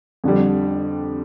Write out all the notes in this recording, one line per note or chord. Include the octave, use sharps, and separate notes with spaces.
F2 D3 G3